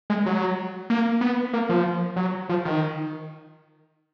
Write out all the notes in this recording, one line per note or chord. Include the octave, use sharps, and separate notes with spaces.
G#3
F#3
A#3
B3
A#3
F3
F#3
F3
D#3